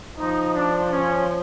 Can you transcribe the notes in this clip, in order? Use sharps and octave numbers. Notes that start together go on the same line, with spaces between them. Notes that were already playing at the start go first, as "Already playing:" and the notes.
F3 D#4
D4
C#4